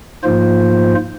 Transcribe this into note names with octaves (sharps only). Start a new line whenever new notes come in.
G#2 F3 A#3 F4 C5